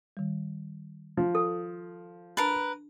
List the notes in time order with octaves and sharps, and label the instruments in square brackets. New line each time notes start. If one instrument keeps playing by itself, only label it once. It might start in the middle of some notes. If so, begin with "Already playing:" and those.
[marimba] D#3 G3
[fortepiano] F3
[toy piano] A4
[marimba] D4 A5 A6 [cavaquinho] A#4 B4